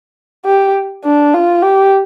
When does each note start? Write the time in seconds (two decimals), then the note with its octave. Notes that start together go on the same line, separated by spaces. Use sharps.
0.46 G4
1.05 D4
1.34 F4
1.63 G4